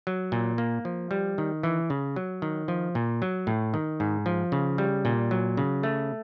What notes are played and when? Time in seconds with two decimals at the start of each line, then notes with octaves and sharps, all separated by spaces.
0.07 F#3
0.32 A#2
0.58 A#3
0.85 F3
1.11 G3
1.38 D#3
1.63 E3
1.90 C#3
2.16 F#3
2.42 D#3
2.68 F3
2.95 A#2
3.22 F#3
3.47 A2
3.74 D#3
4.00 G#2
4.26 F3
4.52 C#3
4.78 G3
5.05 A#2
5.31 F#3
5.57 C#3
5.83 A3